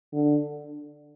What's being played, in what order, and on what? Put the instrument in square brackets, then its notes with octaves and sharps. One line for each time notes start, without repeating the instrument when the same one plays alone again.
[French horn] D3